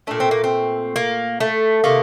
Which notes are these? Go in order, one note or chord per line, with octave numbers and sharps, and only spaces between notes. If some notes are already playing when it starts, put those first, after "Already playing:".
A#2 A3 D4
C4
A#3
C4
A#3
A3
C3 D#3 A3 A#3